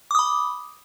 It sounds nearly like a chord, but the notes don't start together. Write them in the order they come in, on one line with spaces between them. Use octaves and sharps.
D6 D#6 B5